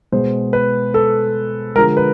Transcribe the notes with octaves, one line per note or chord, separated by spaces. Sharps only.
B2 G#3 C5
B4
A4
D3 F3 G#3 A#4
B4